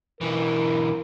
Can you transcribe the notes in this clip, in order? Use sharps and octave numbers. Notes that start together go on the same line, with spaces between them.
B1 E3 A#4